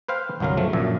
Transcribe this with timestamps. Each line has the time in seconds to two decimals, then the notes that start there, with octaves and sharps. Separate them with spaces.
0.08 B4 C5 F5 G5
0.40 G1 C2 F#3 A#4 F5
0.57 C#3 F3 F#3 A3
0.73 A#1 F#2 A#2 E5